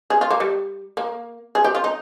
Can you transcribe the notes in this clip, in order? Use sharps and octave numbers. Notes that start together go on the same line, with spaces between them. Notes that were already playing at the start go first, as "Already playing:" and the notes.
G#4
F4
A#3
G3
A#3
G#4
G4
F4
D#4